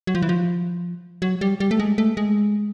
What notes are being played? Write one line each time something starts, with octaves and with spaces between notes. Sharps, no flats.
F#3
F3
E3
F3
F#3
G3
G3
A3
G#3
A3
G#3